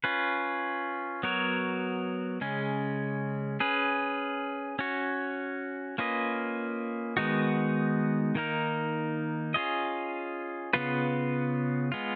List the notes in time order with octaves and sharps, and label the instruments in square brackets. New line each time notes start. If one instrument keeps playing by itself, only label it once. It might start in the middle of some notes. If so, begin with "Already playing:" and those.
[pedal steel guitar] C#4 F4 B4
F#3 B3 F#4 A#4 C#5
C#3 G#3 C#4
C#4 G#4 B4
C#4 F#4 C#5
A#3 C#4 F4 B4 D#5
D#3 G#3 B3 D#4 F#4
D#3 A#3 D#4 A#4
C#4 F4 G#4 D#5
C#3 F3 B3 F4 B4
G#3 B3 F4